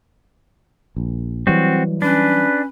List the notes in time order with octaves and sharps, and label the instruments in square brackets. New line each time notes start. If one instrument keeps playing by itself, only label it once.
[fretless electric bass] A#1
[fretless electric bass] E3 F#3 G3 [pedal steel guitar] C4 F#4
[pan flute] C#4 [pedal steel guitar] D4 [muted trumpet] B4